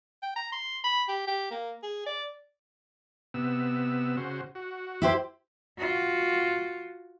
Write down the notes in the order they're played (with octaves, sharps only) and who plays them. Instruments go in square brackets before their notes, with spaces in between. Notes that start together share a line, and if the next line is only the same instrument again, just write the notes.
[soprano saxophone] G5
A#5
C6
B5
G4
G4
A#3
G#4
D5
[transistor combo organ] C3 B3 E6
C#3 F#4 C5
F#4
[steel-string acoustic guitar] E4 G4 C5
[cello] F4 F#4